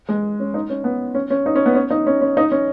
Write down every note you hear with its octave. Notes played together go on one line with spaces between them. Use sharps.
G#3
C#4
D#4
C#4
B3
C#4
C#4
D#4
C#4
B3
C#4
D#4
C#4
C#4
D#4
C#4